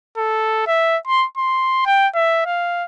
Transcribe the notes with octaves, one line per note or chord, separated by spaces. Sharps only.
A4
E5
C6
C6
G5
E5
F5